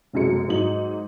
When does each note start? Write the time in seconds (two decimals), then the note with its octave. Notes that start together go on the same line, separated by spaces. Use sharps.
0.13 F1 B1 F#2 F#3 G#3 C#7
0.48 G#2 F#3 D#4 F#7